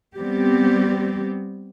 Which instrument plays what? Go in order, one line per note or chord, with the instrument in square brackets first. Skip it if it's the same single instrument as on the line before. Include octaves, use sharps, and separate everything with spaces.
[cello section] G3 B3 C4 G4